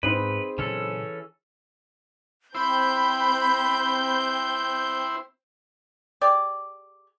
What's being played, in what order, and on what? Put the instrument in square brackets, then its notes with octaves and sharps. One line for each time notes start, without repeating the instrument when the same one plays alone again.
[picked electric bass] G#2 [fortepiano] C4 D#4 [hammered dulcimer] G#4 B5 [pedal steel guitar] B4
[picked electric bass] A#2 C#3 F#3 [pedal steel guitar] E3 C#4 A4
[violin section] C4 G6 [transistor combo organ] E4 C5 [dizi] B5
[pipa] G4 G#4 D5